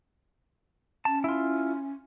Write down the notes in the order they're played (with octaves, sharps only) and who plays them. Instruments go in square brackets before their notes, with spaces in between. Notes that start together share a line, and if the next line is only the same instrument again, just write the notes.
[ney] C#4 [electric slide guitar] A5
[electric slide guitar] E4 F4